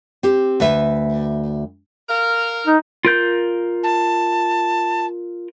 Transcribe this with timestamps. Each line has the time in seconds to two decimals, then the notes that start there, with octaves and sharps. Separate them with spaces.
0.23 C4 G4
0.60 D2 B4 E5
2.09 A#4 F5
2.67 D#4
3.05 F4 A#4 G6
3.83 A5